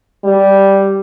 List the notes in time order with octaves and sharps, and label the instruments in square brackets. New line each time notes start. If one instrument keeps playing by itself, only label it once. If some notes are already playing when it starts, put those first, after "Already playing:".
[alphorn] G3